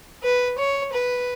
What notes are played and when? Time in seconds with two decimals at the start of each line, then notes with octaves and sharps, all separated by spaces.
0.23 B4
0.58 C#5
0.93 B4